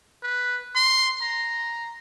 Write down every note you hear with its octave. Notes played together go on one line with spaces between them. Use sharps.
B4
C6
A#5